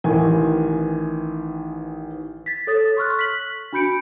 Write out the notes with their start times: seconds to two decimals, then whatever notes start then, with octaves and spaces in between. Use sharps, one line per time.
0.04 A1 D#3 E3 G#5
2.46 A6 B6
2.67 A4 C#5 D#6 A6
2.97 C6 C#6 F6 F#6
3.19 B6 F#7
3.72 D4 F#4 B5 G6 C#7 D7